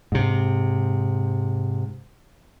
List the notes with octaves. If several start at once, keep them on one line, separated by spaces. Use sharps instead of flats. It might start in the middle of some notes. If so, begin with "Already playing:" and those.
G#2 C3